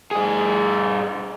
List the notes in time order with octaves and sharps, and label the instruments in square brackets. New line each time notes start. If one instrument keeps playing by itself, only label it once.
[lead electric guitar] G2 G#4